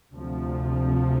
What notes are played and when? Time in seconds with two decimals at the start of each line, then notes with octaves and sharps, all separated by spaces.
0.12 D2 C3 F3